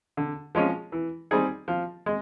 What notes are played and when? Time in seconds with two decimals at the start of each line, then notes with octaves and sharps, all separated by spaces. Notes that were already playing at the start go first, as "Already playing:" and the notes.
0.17 D3
0.55 F3 G#3 C#4
0.92 E3
1.31 G3 C4 D#4 G#4
1.68 F3
2.06 G#3